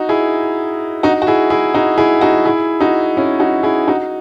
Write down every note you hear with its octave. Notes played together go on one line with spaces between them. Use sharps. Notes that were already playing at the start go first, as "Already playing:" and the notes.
Already playing: D#4 F#4
E4 G#4
D#4 F#4
F#4
E4 G#4
E4 G#4
D#4 F#4
E4 G#4
D#4 F#4
E4 G#4
D#4 F#4
C#4 E4
D#4 F#4
E4 G#4
D#4 F#4